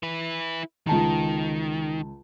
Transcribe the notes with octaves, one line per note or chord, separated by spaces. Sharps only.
E4 B4
C#2 D#3 A5 A#5